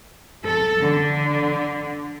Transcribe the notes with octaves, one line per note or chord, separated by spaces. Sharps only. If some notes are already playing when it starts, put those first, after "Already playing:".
A4
D3